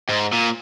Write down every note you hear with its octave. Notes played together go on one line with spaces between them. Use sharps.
G#2
A#2